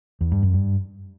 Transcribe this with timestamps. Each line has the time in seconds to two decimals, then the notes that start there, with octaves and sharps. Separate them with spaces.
0.21 E2
0.32 G2
0.43 F#2
0.54 G2